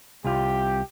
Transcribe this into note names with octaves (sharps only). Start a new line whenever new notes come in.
C2 F4 G4